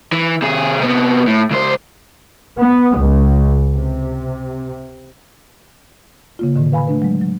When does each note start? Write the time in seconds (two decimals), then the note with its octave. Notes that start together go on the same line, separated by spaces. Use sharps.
0.13 E3
0.43 C3 G#4
0.81 C3 B3
1.27 A2
1.50 C#2 C5
2.58 B3
2.99 C#2
3.72 C3
6.39 C#3 A#3 F4
6.56 A2 D3 D#3
6.72 B4 F5 G#5 B5
6.87 A3 D4 B4
7.02 F#3 G#3
7.21 F#3